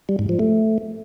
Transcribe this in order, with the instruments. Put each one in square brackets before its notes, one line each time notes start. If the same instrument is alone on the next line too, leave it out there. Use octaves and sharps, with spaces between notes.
[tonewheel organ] G3
G#2
F3
A3